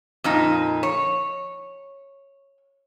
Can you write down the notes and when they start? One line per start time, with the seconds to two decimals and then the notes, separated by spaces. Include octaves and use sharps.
0.24 F2 A#2 D#4
0.83 C#5